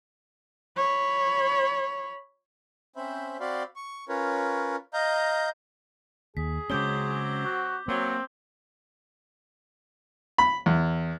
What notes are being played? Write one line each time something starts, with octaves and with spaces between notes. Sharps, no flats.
C#5 B5
C4 C#4 C5 E5 B5
C4 F#4 D5 F5 B5 C6
C#6
C#4 F4 A#4 B4 C#5
D#5 F5 A#5 G6
D#2 G#4 B6
C#3 F#3 G#3 C4 C#4 D6 G6 G7
F#4
F#3 A#3 C4
B5
E2